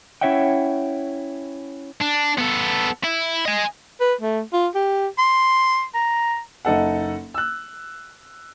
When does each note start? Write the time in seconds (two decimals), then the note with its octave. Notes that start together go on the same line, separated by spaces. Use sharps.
0.21 C#4 E4 C#5 E5 F#5 G5
2.01 D4
2.38 B3 A4
3.04 E4
3.46 D#5 G#5
4.01 B4
4.21 A3
4.53 F4
4.75 G4
5.18 C6
5.94 A#5
6.65 F#1 D#4 A4 F#5
7.34 E6 F#6